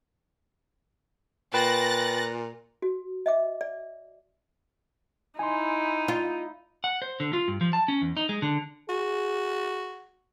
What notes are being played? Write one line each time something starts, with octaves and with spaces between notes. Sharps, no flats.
A#2 B4 G5 B5 F#6 A6 A#6
F#4
D#5 E5 D6
D5
D#4 E4 G#5 C6
F4
F#5
C5
D3
F4
G2
F3
A5
C#4
E2
D#4
G#3
D3
F#4 G#4